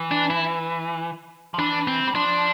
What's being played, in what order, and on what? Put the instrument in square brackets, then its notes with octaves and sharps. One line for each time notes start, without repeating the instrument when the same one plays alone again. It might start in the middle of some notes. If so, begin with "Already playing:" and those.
Already playing: [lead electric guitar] E3
[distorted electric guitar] D4
E4
[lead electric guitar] F3
[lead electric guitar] E3 [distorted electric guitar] D4
[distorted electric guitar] C4
[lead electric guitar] G3
[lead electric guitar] F3 [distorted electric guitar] D4